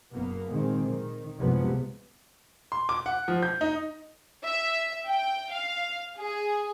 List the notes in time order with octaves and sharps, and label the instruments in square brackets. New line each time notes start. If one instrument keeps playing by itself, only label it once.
[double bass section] F#1 A#3 B3
A#2 D#3 G#3 C4
D#3
C2 F#2 C3 F3 G#3 B3
[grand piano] C6
D6
F#5
F3
G6
D#4
[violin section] E5
G5
F5
G#4